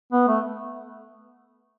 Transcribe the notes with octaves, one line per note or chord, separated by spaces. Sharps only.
B3
A3